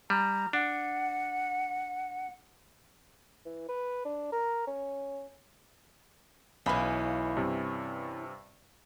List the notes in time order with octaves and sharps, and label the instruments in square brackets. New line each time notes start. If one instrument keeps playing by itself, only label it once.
[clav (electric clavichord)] G3 [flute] A#5
[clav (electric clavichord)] D4 [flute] F#5
[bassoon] E3
B4
D4
A#4
C#4
[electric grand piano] B1 F5 B5 [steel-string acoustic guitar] E3 C#4
[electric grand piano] G2 C3